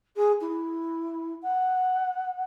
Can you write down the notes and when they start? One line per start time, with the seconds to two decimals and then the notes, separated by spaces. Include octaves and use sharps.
0.16 G#4
0.41 E4
1.42 F#5